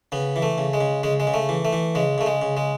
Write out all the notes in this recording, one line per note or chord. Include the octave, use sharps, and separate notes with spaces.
C#3 B3
E3
A3
C#3
G#3
C#3
C#3 G#3
G#3
C#3
A3
E3
A3
E3
C#3 G#3
C#3 A3
G#3
C#3
G#3